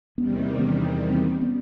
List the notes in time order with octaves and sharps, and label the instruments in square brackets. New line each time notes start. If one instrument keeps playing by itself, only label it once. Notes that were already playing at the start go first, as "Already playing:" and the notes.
[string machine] E2 C3 D#3 G3 [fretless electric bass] B3 C#4
[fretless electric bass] A#3 C4
B3 C#4
A#3 C4
B3 C#4